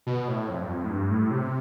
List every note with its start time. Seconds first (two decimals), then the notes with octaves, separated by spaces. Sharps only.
0.07 B2
0.28 A2
0.49 F2
0.60 G2
0.69 F2
0.84 A2
0.90 G2
1.11 A2
1.31 C3